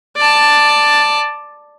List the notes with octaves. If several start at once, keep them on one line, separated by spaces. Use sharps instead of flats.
D5 A5